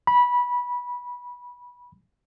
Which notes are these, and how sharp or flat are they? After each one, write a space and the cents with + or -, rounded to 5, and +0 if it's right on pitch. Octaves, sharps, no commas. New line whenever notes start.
B5 -15